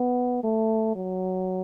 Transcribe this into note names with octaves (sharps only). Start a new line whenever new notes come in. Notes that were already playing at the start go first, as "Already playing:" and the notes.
Already playing: B3
A3
F#3